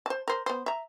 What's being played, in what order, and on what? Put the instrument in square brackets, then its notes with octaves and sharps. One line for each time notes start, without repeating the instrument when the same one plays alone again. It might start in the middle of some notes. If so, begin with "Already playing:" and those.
[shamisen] C5 A5
A#4 C5
B3 C5
E5 A#5